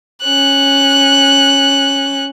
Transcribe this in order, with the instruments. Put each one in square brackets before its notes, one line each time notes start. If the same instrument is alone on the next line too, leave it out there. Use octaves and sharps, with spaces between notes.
[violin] C#4 F#6